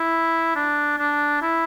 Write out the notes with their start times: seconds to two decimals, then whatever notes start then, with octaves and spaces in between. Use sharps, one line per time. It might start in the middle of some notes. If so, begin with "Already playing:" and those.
Already playing: E4
0.56 D4
0.98 D4
1.42 E4